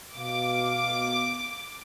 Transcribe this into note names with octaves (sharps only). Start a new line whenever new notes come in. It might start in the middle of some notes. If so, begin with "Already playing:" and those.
B2 F5 D6